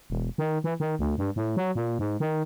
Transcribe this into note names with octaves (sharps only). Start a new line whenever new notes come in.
E1
D#3
E3
D#3
D2
G2
A2
F#3
A#2
G#2
D#3